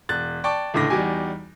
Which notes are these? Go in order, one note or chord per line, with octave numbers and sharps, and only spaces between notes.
E1 F#6 A6
D5 G5 A5 C#6 D6
C#2 A2 D3 D6 A#6
E2 G3 D#4 F#4 G4 G#5